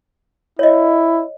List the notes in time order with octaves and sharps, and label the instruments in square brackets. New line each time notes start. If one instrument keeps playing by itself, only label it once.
[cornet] E4 [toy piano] C#5 D#5